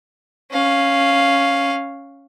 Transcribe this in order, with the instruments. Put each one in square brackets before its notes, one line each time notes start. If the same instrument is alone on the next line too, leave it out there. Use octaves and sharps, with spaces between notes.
[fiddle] C#4 F5